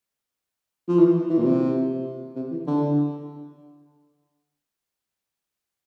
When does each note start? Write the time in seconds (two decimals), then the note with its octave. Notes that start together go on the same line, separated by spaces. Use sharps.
0.88 F3
0.99 E3
1.30 E3
1.39 A#2
1.45 C3
2.36 C3
2.51 E3
2.67 D3